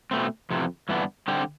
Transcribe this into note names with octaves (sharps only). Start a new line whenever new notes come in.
B2 A3 C4
F2 C3 E3
G2 E3 B3 D4
D3 G3 C4 G4